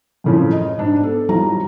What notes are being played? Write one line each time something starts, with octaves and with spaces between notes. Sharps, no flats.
F#2 A2 C#3 E3 F3
D#5
G#2 D4
B3 A4
G#1 E2 F#3 G3 F4 A#5